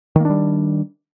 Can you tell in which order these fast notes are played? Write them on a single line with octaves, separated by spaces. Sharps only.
D#3 A#3 D4 G3